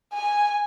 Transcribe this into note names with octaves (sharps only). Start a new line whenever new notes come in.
G#5